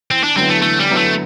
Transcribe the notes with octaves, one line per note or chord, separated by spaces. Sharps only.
E2 C4
D4
D3 F#3 B3 C4 E4
A3
E2 A3
G3
D3 F#3 B3 E4
A3